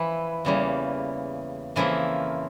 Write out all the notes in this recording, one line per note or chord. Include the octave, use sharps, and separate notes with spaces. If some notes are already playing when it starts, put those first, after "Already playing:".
Already playing: E3 F3 E4
E2 C#3 E3 G3 A#3
F2 C#3 E3 F3 A#3 E4